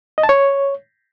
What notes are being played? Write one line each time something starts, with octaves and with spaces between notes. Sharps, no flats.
D#5
A5
C#5